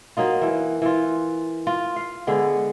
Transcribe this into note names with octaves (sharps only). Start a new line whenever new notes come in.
F#3 A#3 D#4 F4
E3
E3 F4
F4
F5
D3 G#3 B3